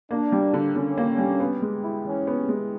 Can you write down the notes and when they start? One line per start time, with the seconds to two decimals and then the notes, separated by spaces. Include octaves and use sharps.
0.11 A#3 D4
0.32 G3
0.54 D3
0.75 D3 C#4
0.98 A#3
1.18 G3
1.40 B3
1.62 G#3
1.84 E4
2.05 E3 C#4
2.27 B3
2.49 G#3